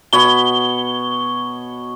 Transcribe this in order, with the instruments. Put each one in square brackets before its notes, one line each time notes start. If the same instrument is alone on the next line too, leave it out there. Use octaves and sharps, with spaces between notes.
[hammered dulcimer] B2 C#5 B5 [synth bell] G7